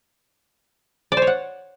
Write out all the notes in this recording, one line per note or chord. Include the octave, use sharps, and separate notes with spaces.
D5
C5
C#5
F#5